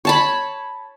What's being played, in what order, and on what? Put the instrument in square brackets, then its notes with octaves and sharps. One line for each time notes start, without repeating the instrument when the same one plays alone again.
[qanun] C#5 A5 B5